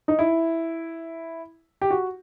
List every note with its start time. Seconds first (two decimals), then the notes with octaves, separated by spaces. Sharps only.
0.08 D#4
0.19 E4
1.82 G4
1.91 F#4